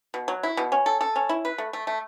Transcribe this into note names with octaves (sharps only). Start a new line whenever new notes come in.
B2
F#3
E4
B2
C#4
A4
A4
C#4
E4
B4
A3
A3
A3